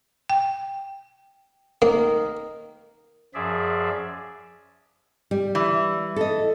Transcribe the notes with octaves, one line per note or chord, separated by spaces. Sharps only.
G5
D#3 A#3
F#2 F3 G#4 D5 E5
G3
E3
A4 D#5